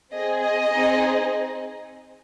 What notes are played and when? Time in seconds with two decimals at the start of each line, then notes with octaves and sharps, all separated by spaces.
0.12 C4 G#4 D#5
0.41 D#5
0.69 C4 D#4 G#4